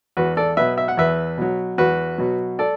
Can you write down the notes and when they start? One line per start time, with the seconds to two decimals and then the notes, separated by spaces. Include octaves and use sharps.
0.17 E2 F#4 B4
0.37 A4 D5
0.57 B2 F#3 B4 E5
0.78 E5
0.88 F#5
0.97 E2 B4 E5
1.38 B2 F#3
1.78 E2 F#4 B4
2.18 B2 F#3
2.59 A4 D5